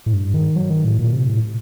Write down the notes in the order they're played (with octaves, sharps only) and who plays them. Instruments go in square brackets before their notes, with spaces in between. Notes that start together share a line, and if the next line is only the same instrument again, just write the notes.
[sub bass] A2
G2
D#3
F#3
D#3
A2
A#2
C3
A2